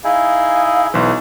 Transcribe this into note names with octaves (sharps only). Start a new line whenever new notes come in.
D#4 E4 G#4 F5
B1 E3 C5